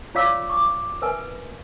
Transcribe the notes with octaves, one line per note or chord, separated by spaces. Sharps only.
F4 C#5 D5 F5 D6 E6
C#6 D6
A#4 B4 E5 G#5